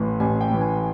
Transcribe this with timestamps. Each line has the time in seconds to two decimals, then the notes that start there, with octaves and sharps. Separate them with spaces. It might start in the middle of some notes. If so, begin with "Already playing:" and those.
Already playing: A1 A2 E3
0.20 A1 G#5
0.41 G5
0.50 A2 E3
0.61 G#5